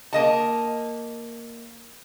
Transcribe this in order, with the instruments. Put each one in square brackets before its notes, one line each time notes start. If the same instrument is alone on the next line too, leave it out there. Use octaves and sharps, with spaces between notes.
[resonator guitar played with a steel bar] A#3 D#5 A5